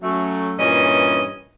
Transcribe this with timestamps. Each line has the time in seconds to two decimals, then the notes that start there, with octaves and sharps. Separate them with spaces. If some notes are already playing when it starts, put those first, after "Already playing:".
0.02 F#3 A3 C#4
0.59 G2 A#2 E3 C#4 C#5 D#5